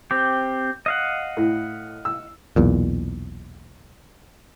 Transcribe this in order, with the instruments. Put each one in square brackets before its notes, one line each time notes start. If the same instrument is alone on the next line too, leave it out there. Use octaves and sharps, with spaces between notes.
[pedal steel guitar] C4 G4
D#5 F5 F#5
[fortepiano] A2
E6
[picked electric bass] B1 E2 A#2